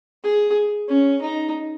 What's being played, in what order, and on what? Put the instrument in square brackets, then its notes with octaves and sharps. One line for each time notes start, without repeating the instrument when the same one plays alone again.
[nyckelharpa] G#4
C#4
D#4